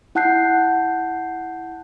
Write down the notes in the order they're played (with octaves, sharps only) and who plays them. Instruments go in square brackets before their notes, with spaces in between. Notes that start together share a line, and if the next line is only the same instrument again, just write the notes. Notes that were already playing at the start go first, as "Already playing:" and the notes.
[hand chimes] E4 F#5 A5 F#6 G6 C7